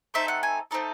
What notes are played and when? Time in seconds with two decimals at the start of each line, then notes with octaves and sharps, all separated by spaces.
0.14 A3 C4 D#4 A4 E5
0.28 F#5
0.43 G#5
0.71 A3 C4 D#4 A4